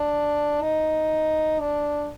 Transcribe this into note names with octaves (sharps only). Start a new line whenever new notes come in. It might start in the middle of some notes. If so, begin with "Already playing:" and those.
Already playing: D4
D#4
D4